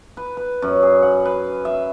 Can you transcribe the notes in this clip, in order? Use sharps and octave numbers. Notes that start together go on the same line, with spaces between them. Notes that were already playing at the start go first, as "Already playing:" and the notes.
B4
B4
F#2
G#4
F#5
B4
E5